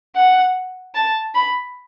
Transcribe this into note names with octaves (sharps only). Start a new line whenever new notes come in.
F#5
A5
B5